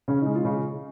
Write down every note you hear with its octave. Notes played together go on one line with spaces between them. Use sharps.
C#3 C#4
G#3 D#4
F4
C#3